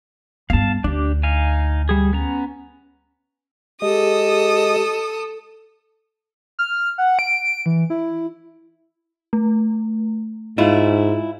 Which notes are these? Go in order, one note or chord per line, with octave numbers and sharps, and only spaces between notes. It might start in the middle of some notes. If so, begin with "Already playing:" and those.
G2 B3 F5 A5
D2 D4 G4
D#4 F5 G#5
G3 G#4
B3 C#4 A#5
G#3 G4 A4 D#5 D#6
F6
F#5
D7
E3
E4
A3
G#2 E4 F4 D#5 F5